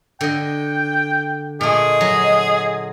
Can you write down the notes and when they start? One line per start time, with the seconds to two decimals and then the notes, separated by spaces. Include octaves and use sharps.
0.21 D3 D#5 G5
1.61 A#2 A3 G#4 D#5
2.01 F#3